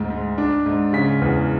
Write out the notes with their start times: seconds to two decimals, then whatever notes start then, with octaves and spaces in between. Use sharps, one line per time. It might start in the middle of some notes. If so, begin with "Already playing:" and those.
Already playing: D2 G#2
0.10 G#2
0.38 D4
0.66 G#2
0.93 C#3 B6
1.21 E2